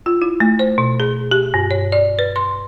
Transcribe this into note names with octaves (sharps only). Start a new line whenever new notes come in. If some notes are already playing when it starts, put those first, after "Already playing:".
F4
E4
A3
C5
B2
G#4
G4
G2
C#5
D5
B4
C6